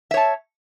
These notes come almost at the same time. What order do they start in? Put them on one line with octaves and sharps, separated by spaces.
E5 C#5 A5